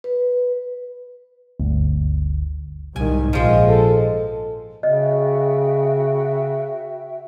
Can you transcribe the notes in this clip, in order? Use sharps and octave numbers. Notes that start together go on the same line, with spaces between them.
B4
G1 D2
C2 G#2 D#3 G#5
A#1 F3 G#3
A4
C#3 F#4 D#5 E5 G5